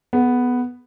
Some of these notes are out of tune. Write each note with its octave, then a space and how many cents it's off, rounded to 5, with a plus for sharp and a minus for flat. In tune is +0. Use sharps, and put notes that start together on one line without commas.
B3 +0 G#4 +45